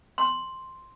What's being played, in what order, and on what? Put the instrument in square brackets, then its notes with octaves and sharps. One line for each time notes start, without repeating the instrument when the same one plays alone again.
[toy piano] C6